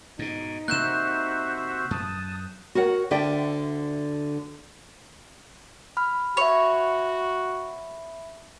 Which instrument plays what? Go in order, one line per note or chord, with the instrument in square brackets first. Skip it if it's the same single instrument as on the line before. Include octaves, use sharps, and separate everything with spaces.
[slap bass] G#2 B2 [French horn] D#4
[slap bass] C3 A#3 [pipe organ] F#4 C5 E5 [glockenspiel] F#6 G6 E7
[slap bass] F#2 [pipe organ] A5 D#6
[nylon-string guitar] F#4 A#4 C#5 F#5
D2 D3 D5 E5 G5
[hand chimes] B5 F6
[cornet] F#4 [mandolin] C#5 [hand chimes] E5 B5